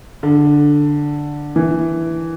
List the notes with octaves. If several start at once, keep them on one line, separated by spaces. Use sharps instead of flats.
D3
E3